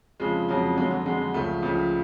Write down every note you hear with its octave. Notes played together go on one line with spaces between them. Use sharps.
F2 C#3 F3 G#3
F2 C#3 F3 F#3
F2 D3 F#3 G#3
F#3
F2 D3 F#3 G#3
C#2 C#3 F3 A3
C#2 C#3 F3